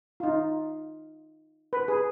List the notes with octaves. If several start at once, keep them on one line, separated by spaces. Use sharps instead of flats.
F4
D#4
B4
G#4